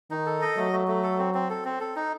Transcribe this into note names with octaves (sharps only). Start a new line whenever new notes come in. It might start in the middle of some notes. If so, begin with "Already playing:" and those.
D#3 D#4
A4
D#5
F#3 A3
A3
A3
A4
C4
C4
A4
C4
A4
D#4